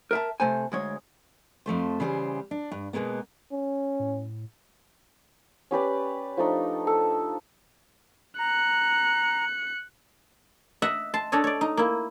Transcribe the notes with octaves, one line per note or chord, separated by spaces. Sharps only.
A#4 E5 A5
C3 A3 C5 G#5
D2 G#3 C#5
F2 F3 A3 C5
C#3 E3 G3 F#4 G#4 C5
D4
G2
B2 F3 G#3 A#3 B3
C#4
A2
C#4 G4 B4 D5
F3 A3 D4 D#4
A4
A#5 F#6 C#7
D#5 E5 F#5
A5 C6
D4 A4 C#5 D#5
C#5 D5
D#4
A#3 E4